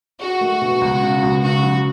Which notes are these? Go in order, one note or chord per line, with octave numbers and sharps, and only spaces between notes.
F#4 G#4
A3
B2
C#2
C#3
C#2
C#3 F#4
F#3